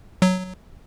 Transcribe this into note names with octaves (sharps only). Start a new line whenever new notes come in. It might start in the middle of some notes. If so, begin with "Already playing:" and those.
F#3